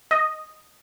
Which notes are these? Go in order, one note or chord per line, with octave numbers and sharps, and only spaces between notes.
D#5